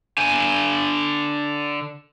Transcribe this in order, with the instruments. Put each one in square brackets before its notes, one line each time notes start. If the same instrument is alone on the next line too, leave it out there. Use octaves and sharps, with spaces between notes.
[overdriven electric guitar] D3 G#5